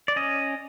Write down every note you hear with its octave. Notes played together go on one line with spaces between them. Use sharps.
D5
C#4 D#5